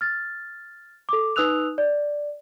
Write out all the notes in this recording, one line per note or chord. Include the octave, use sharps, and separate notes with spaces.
F6 A6
A4 D6
D#4 B4 D#6 E6 F#6 F7
D5